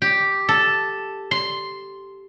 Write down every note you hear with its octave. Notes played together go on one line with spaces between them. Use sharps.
G4
A4
C6